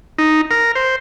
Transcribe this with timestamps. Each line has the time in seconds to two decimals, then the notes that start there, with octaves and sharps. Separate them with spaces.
0.18 D#4
0.51 A#4
0.75 C5